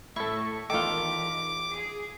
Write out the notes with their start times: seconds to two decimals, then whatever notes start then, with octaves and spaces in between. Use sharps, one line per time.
0.16 A2 E4 A4 C#6
0.70 E2 D#3 F4 A4 D6
1.73 G#4